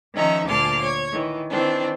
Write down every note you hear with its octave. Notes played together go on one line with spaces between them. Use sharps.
D#3 F3 C#4 D#4 E5 A#5
D2 A#2 A5 C6 D6 F6
C#5 G#6
D#3 E3
D#3 E3 C4 D4